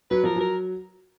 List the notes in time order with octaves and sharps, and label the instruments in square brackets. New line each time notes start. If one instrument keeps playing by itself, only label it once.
[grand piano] F#3 [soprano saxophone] B4
[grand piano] F3 [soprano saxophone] A#4
[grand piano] F#3 [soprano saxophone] A#4